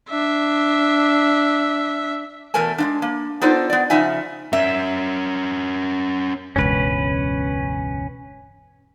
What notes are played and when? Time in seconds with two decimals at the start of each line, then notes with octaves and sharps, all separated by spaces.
0.10 D4 E5
2.54 E2 B2 A3 A#4 G#5 A5
2.78 G#3 A#3 D4
3.02 A#3
3.41 B3 D4 D#4 F4 A4 C5
3.70 B3 D5
3.90 C#3 F3 D#4 E5 F#5 G#5
4.53 C#4 A#4 E5
6.56 E1 C#2 G2 C#4 B4